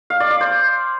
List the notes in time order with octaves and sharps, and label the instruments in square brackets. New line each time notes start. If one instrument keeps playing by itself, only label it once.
[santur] F5
D5
D5
C5